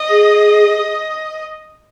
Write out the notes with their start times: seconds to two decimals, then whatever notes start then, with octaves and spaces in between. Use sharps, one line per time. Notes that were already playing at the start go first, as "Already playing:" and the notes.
Already playing: D#5
0.09 G#4